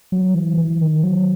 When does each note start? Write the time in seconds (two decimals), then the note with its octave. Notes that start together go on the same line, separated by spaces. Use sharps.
0.12 F#3
0.35 E3
0.57 E3
0.81 D#3
1.03 F#3